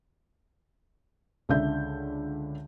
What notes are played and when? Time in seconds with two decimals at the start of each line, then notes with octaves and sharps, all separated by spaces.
1.49 C#2 D3 D5 E5 G6